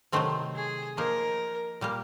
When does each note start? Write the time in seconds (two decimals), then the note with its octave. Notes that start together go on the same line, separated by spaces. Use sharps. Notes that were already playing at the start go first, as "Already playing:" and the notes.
0.12 C3 D#3 F#3 A3 C4
0.55 G#4
0.97 F3 A#3 D#4 A#4
1.81 A#2 G3 A#3